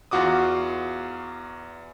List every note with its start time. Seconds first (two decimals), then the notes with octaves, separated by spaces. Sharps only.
0.11 E2 F4 F#4 D6 D#6